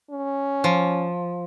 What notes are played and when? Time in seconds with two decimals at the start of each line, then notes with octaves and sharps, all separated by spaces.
0.11 C#4
0.64 F3